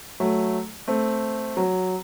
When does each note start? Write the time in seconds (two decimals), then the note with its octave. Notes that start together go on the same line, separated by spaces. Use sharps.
0.20 F#3 A3
0.88 A3 C4
1.57 F#3